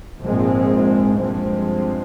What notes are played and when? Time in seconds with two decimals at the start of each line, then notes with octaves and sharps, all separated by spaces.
0.23 A#1 G#2 F3 G#3 C4
1.21 G2 F3 G#3 C4